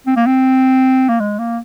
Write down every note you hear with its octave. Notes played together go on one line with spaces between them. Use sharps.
C4
A#3
C4
A#3
G#3
A#3